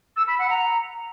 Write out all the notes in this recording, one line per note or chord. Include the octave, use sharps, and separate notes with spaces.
E6
B5
F#5
A#5